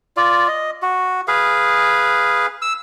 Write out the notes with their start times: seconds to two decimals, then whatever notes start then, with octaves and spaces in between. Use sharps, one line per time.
0.17 F4 D5
0.48 D#5
0.82 F#4
1.28 G#4 B4 F5
2.62 E6